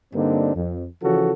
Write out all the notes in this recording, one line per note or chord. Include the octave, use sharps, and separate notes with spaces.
G2 D3 A#3 C4 D4 D#4
F2
C#3 E3 F3 F#4 A4